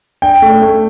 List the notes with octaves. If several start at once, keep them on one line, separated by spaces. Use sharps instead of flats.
D4 G5
A3
A3